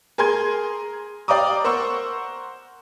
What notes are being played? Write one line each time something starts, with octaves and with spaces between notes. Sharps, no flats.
G#4 A#4 G#5 C6 G#6
D5 F5 G5 A#5 D6 D#6
A#4 C5 F#5 C#6 E6